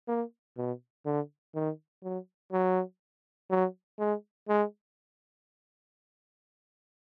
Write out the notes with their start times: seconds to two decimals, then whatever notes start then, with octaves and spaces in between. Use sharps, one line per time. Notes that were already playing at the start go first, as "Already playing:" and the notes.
0.08 A#3
0.57 B2
1.06 D3
1.55 D#3
2.03 F#3
2.52 F#3
3.50 F#3
3.99 G#3
4.49 G#3